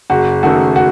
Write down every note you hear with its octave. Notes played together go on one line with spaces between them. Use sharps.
F#1 F#4
F#2 D#3 A3 F#4
F#4